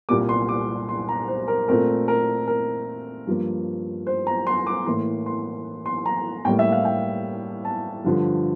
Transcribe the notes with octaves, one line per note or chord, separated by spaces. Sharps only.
C2 A#2 G3 A#3 D6
C6
D6
C6
A#5
C5
A#4
A#2 A3 C4 A#4
A#4
A#4
G2 F3 A#3
C5
A#5
C6
D6
A2 E3 A#3 C6
C6
C6
A#5
A2 G3 A#3 G5
E5
F5
G5
A5
G2 D3 F3